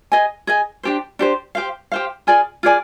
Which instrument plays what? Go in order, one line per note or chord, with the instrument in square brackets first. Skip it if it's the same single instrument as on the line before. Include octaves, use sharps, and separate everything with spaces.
[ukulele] G#4 D#5 G#5
G#4 D#5 G#5
D4 G4 C5
D4 G4 C5
G4 C5 F5
G4 C5 F5
F4 G#4 D5 G#5
F4 G#4 D5 G#5